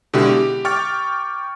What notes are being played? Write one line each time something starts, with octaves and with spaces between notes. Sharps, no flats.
B2 D3 G#3 E4 G4
G4
G5 C#6 D6 F6 A6